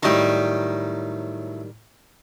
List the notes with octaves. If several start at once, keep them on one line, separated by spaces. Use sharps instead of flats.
A2 D#3 F#3 G3